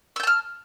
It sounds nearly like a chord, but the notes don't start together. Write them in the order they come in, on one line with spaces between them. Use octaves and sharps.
E6 G6 A5 F6